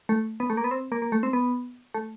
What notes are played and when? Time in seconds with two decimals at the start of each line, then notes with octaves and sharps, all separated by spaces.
0.09 A3
0.40 B3
0.50 A3
0.57 A#3
0.64 B3
0.71 C4
0.92 A#3
1.02 A#3
1.12 A3
1.23 C4
1.33 B3
1.94 A3